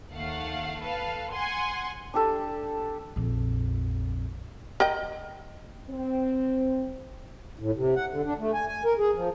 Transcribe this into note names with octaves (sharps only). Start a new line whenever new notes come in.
D#2 A3 F5 F#5
A4 B4 F5
F#5 G#5 C6
D4 G4 A4 D5
A#1 F2
A#4 D#5 G5
C4
A2
C3
F#5
D3
D4
A3
G#5
G#5
A#4
G#4
F3